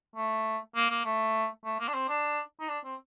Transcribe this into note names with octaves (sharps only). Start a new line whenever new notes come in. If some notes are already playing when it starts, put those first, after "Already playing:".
A3
A#3
A#3
A3
A3
A#3
D4
C4
D4
D#4
D4
C4